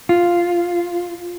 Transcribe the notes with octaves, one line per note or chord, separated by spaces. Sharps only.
F4